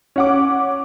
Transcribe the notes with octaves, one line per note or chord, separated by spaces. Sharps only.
C#4 F#5 D6